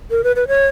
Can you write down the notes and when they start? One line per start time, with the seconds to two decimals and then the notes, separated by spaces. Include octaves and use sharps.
0.11 A#4
0.24 B4
0.36 B4
0.48 C#5